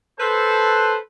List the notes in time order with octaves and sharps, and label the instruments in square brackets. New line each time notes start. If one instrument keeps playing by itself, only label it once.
[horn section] A4 B4 C5